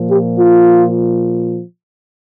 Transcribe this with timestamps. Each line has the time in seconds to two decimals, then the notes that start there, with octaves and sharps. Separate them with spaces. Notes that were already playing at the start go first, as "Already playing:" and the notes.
Already playing: A#2 F3
0.11 G4
0.39 F4